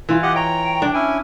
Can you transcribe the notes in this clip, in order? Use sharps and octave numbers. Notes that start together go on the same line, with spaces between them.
E3 F4
G4 D#5 F#5
C#5 G5 A#5
D4
C#4 E4 G#5